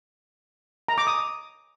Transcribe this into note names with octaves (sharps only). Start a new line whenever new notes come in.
A#5
D6
D#6